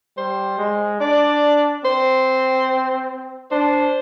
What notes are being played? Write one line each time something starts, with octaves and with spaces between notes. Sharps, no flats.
G3 C5
G#3
D4 D5
C4 C5
D4 C5